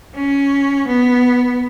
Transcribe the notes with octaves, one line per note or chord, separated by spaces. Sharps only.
C#4
B3